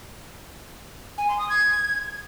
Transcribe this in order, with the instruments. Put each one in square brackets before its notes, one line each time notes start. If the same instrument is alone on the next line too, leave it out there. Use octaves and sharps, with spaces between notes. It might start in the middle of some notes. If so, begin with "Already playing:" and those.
[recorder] G#5
C6
D#6
G#6